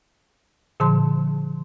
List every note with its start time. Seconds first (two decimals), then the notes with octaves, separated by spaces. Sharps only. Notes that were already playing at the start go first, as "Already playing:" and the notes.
0.80 A#2 D3 F3 A5 C6